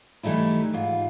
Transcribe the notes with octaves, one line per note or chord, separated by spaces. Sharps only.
E3 G3 A3 D#4 E4
G#2 F4